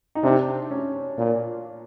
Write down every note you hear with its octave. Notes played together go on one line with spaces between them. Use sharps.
D#4
C3 D4
C#4
A#2